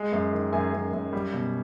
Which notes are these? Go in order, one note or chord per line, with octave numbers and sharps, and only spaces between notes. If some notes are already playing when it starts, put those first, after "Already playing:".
Already playing: G#3
F#2
D#3
F#2 G#5
F#2
F#2
G3
B2